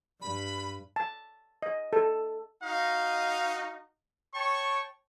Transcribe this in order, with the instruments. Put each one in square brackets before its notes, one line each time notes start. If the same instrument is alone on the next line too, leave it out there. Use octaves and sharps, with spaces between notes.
[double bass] G2 [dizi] B5
[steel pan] A5
D#5
A4
[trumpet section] D#4 F#4 D#5 F5
C#5 G5 A5 C#6